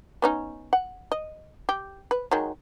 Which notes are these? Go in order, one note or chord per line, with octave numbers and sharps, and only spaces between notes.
B3 C#4 D#4
F#5
D#5
G4
B4
D#3 F#3 G#3